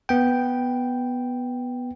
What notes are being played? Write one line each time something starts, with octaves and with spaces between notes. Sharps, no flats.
B3 G5